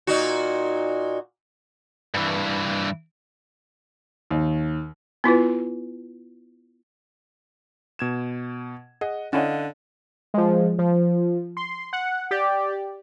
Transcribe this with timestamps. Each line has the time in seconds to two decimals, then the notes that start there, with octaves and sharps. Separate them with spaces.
0.07 A#2 D#4 F#4
2.14 G2 E3
4.31 D#2
5.24 B3 E4 F4 B4
7.99 B2 G#6 E7
9.01 G#4 D#5 F#5
9.33 D3 C#4 E4 C#5 D#5 F5 F#5
10.34 F3 G#3
10.79 F3
11.57 C6
11.93 F#5
12.31 G4 D5